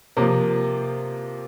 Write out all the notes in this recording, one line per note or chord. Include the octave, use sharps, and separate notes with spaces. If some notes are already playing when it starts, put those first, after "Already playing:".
C3 F3 A#3